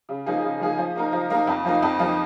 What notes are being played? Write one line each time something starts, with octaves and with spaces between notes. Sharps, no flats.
C#3
F3 A#3 D#4 G#4
C#3
F3 A#3 D#4 G#4
F3
A#3 D#4 A#4
F3
A#3 D#4 A#4
F2
F3 A#3 D#4
F2
F3 A#3 D#4